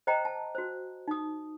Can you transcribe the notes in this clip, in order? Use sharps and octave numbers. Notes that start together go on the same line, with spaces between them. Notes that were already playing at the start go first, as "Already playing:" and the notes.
C5 D#5 G5 A#5
A5
F#4 C5
D#4 D#6